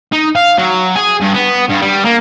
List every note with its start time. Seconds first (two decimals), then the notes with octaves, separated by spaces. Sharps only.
0.12 D#4
0.36 F5
0.58 F#3
0.95 G#4
1.21 G2
1.34 B3
1.69 G2
1.81 G3
2.05 A#3